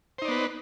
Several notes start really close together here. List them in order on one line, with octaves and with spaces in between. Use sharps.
C5 D#4 D5 B3 B4